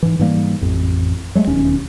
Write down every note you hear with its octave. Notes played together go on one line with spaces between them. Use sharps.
G#2 E3
G#2 E3 G3 A#3
A1 F2
F#3 G#3 A3
E1 D#2 C#4